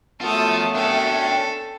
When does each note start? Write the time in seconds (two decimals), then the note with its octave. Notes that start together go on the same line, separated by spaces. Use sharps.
0.21 F#2 F3 A3 B3 F4 A4 D#6
0.75 C#4 D4 A4 G5